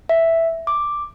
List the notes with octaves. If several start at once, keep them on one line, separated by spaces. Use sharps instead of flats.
E5
D6